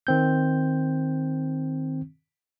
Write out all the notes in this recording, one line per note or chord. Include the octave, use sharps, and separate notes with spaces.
D#3 C4 G6